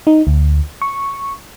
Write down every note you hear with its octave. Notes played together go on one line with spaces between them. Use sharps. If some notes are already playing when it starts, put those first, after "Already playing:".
D#4
D2
C#6